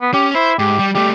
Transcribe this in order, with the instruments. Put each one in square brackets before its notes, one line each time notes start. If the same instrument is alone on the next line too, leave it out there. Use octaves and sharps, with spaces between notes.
[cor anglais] B3
[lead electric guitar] C#4 [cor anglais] G4
[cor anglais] E4 [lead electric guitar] C5
[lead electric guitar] G#2 [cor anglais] G4
[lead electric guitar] G3
[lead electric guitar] G3 A3 [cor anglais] G4